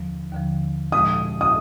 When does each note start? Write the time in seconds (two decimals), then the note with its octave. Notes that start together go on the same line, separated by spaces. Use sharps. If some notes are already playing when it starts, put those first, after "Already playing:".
Already playing: D#2 D3 F3
0.32 D#2 D3 F3
0.92 A#2 F3 G#3 D#6
1.41 D#6